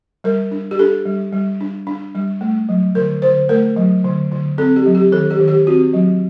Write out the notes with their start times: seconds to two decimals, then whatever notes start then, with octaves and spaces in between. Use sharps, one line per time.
0.24 G3 A#4
0.51 D4
0.71 G4
0.79 D4 A4
1.06 G3
1.33 G3
1.61 D4
1.87 D4
2.15 G3
2.41 A3
2.69 F#3
2.95 D3 A#4
3.22 D3 C5
3.49 A3 A#4
3.76 F#3
4.05 D3
4.32 D3
4.58 C4 A4
4.76 G4
4.86 F#3
4.95 G4
5.12 D#3 A4
5.31 G4
5.40 D#3
5.48 G4
5.67 C4 F#4
5.94 F#3